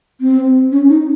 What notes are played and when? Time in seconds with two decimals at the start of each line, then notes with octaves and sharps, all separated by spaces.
0.21 C4
0.72 C#4
0.89 D#4